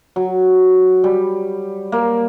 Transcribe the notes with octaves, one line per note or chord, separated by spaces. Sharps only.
F#3
G3
A#3